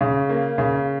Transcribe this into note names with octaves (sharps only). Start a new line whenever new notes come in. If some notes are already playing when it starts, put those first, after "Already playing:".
C#3
A#3
C#3